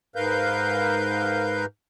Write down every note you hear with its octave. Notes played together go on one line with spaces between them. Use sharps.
G#2 A#4 B4 F5 G6